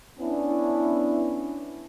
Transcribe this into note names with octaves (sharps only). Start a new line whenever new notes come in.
B3 C#4 D4 E4